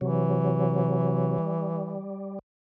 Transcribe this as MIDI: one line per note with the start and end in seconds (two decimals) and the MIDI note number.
0.01 1.38 48
0.01 2.05 52
0.01 1.38 54
1.38 2.39 55